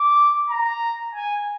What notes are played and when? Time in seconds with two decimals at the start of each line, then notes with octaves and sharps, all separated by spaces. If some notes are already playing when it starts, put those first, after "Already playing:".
Already playing: D6
0.50 A#5
1.15 G#5